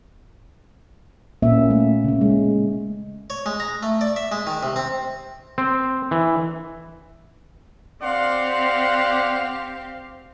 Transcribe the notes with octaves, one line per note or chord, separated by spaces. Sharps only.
A#2 A#3 C#4 E5
A3
C#3 C#4
G#3
C#5
G#3
A#5
A3
D5
E5
G#3
D#3
C3
C4
C4
E3
C4 G4 D5 F5 F#5 C6